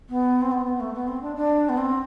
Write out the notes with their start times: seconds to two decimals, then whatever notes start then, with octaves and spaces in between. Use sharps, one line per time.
0.09 B3
0.42 C4
0.52 B3
0.66 B3
0.80 A3
0.93 B3
1.08 C4
1.22 D4
1.36 D4
1.69 B3
1.78 C4